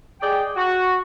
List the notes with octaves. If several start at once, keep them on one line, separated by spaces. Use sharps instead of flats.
G#4 D5 D#5 G5
F#4